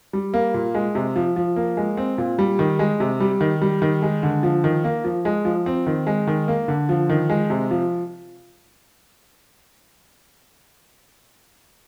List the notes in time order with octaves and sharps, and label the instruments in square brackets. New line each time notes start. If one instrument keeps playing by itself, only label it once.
[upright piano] G3
A#3
A#2
G#3
C3
F3
F3
A#3
G#3
C4
A#2
G3
D#3
G#3
C3
G3
D#3
G3
D#3
G#3
D3
F3
D#3
A#3
F3
G#3
F3
C4
D#3
G#3
D#3
A#3
D3
F3
D#3
G#3
C3
F3